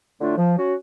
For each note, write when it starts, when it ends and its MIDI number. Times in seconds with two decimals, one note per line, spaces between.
0.21 0.36 45
0.21 0.36 50
0.21 0.36 57
0.21 0.36 62
0.21 0.36 65
0.38 0.53 53
0.57 0.74 61
0.57 0.74 66